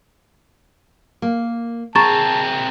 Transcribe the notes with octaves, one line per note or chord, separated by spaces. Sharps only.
A#3
C4 G#4 A#4 A5 A#5 C#6 A6